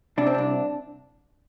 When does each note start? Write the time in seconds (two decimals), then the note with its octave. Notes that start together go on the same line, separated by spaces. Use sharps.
0.18 C3 D4
0.27 C4
0.35 C2 D4